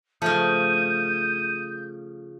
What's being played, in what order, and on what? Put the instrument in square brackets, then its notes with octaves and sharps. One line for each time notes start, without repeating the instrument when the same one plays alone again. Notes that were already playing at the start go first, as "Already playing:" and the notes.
[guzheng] C#3 F3 [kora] A3 [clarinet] D#6 [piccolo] G6